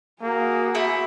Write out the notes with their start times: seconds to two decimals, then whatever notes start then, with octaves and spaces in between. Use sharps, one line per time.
0.22 A#3 F#4 G#4
0.75 A3 C4 E4